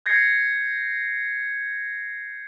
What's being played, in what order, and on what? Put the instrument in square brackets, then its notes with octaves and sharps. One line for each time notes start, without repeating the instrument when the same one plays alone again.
[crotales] G6 G#6 A#6 C7 C#7